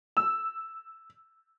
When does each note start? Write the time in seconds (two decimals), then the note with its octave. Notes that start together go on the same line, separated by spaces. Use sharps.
0.17 E6